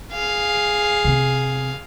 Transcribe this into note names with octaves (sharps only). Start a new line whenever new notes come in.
G#4 F5
C3 C4